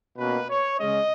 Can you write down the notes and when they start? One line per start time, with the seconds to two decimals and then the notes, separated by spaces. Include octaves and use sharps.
0.18 B2 A#3 C#4 B4
0.49 C#5
0.80 C#3 G#3 C#4 D#5